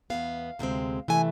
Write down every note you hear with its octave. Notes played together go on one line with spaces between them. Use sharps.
E2 B2 B3 F5
D2 C3 G#3 C4
C3 E3 A3 G#5